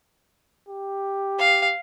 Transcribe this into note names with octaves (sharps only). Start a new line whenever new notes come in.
G4
F5